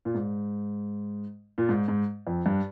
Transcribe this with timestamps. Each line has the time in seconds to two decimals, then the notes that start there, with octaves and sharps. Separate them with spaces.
0.05 A#2
0.15 G#2
1.58 A#2
1.69 G#2
1.88 G#2
2.27 F2
2.46 G2